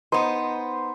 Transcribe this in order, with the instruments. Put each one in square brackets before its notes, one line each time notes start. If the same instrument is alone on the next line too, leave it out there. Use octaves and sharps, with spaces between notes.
[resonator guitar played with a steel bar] B3 D#4 [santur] C5